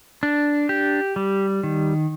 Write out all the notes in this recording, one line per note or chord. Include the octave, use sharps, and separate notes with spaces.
D4
G4
G3
D#3